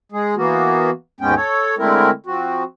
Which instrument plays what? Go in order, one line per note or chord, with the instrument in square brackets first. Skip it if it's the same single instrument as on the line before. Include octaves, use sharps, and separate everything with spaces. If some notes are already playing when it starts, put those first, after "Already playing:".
[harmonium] G#3 G#4
E3 A#3 B3 F#4
D#2 G#2 G#3 B3 C#4 G5
A4 C#5
D3 G#3 A3 C4 E4 A#4
F3 C4 F#4